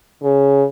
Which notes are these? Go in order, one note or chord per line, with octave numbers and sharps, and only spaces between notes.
C#3